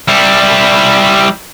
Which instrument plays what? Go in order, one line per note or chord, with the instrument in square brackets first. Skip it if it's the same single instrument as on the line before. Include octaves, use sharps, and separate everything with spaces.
[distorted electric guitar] G3 E4